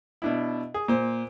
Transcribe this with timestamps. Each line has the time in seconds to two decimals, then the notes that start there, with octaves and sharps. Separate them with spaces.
0.22 B2 D4 E4
0.74 G#4
0.88 A#2 C5